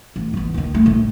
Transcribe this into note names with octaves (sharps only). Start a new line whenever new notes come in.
A1
E3 B3
D#2 D#3
A3
A2 A3